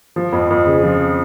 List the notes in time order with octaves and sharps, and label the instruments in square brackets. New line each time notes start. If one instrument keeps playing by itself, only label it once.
[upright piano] F3
F2
F2
C#3
F3